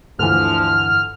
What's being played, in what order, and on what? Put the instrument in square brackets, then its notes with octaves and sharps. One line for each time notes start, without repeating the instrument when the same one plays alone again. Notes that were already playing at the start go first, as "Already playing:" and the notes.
[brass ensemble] D2 F3 [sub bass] G2 [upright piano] D3 E3 [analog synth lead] F6